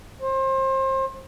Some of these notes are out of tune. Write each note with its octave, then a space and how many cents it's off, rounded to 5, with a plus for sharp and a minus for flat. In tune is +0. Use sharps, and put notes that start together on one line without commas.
C5 +30